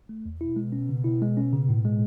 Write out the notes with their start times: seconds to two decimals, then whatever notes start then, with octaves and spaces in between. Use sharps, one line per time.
0.09 A3
0.25 E2
0.41 B2 E4
0.56 G#3
0.72 C#4
0.89 C#3
1.04 E4
1.22 G#3
1.37 C#4
1.53 C#3
1.69 A2
1.85 G#3